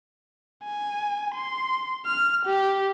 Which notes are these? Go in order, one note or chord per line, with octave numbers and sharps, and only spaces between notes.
G#5
C6
F6
G4